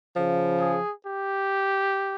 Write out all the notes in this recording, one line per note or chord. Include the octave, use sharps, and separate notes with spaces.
C#3 F3
G#4
G4